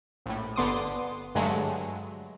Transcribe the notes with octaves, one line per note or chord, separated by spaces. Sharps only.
A#1 A2
G1 D3 B3 C6 D6 D#6
G2 D3 F#3 G#3 A3